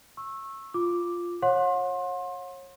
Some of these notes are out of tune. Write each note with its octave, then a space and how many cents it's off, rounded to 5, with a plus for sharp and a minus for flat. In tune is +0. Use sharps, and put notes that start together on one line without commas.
C#6 -25 E6 +0
F4 +0 D6 +0
C#5 -30 F#5 -40 C6 +30